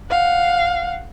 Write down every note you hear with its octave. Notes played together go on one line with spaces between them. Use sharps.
F5 F#5